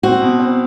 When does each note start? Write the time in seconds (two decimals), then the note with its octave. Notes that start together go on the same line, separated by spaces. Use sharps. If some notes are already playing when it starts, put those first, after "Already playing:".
0.03 C4 F#4
0.22 B2
0.39 C4